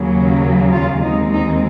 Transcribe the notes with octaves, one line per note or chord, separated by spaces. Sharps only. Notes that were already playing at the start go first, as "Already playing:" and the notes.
Already playing: D#2 C#3 F#3 A#3
F4
D#2 D#3 G#3 C4 D#4
D#4